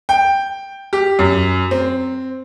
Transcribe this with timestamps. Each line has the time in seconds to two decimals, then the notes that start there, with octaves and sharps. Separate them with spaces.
0.09 G5
0.93 G4
1.19 F#2
1.71 C4